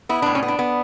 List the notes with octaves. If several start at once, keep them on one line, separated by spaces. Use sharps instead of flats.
B3 E4
A2 D4
C#4
B3
D4
B3